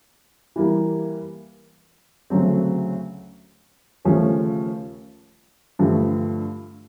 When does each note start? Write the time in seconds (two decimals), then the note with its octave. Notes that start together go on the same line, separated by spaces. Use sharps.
0.56 E3 G3 A#3
2.30 D2 C#3 F#3 A3 C4
4.05 D#2 C#3 F3 A3 C#4
5.79 G2 D3 F3 A3